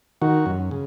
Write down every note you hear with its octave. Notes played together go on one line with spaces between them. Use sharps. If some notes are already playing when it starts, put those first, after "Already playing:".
D#3 F#4
F#2
C#3